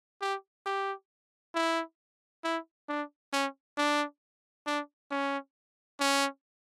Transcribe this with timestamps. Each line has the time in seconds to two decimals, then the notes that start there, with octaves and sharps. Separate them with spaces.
0.21 G4
0.66 G4
1.55 E4
2.44 E4
2.89 D4
3.33 C#4
3.77 D4
4.67 D4
5.11 C#4
6.00 C#4